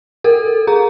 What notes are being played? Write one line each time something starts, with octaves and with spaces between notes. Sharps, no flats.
A4 A#4
G#4 A#5